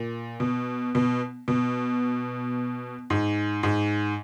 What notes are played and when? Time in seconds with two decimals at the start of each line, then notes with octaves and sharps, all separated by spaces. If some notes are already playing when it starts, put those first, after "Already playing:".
Already playing: A#2
0.40 B2
0.95 B2
1.48 B2
3.10 G#2
3.63 G#2